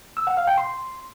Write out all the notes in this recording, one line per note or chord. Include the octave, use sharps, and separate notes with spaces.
E6
F#5
F5
G5
C6